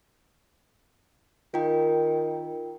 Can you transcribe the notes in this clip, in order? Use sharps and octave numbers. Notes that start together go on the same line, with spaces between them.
D#3 F4 A#4 G5